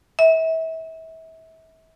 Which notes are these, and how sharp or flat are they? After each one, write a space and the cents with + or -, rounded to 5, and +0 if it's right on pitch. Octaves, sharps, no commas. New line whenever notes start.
E5 -35